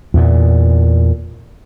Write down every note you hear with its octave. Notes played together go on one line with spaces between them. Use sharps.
E2 A#2